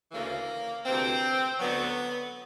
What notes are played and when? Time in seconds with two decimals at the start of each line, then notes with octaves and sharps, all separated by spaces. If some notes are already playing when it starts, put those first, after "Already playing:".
0.11 D2 C#3 E3 A#3
0.85 D2 C3 E3 C4
1.59 D2 D3 F#3 B3